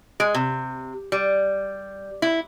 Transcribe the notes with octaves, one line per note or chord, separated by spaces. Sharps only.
G#3
C3
G3
E4